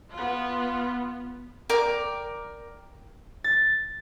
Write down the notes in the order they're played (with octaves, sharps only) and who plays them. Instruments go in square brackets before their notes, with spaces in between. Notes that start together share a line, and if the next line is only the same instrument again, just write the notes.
[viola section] B3 F4
[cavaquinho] A#4 D5 G5 D6
[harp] A6